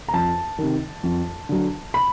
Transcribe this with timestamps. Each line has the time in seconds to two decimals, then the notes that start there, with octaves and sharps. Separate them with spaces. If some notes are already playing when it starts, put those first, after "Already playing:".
0.08 A#5
0.13 F2 A5
0.58 C3 D#3
1.04 F2
1.49 D3 F#3
1.94 B5